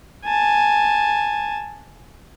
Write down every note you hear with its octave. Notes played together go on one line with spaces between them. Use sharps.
G#5 A5